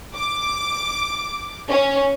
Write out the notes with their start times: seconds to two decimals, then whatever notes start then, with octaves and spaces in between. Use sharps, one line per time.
0.16 D6
1.71 C#4